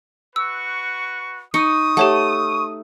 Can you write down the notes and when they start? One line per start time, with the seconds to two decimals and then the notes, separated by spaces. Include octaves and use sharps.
0.36 F#4 B4 C#6 E6
1.54 D#4 C#6 D#6 C#7
1.97 A3 G4 C#5 F#5